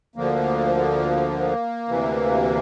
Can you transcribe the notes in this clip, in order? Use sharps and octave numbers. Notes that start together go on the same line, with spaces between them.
D2 D3 F3 A#3
D2 C3 E3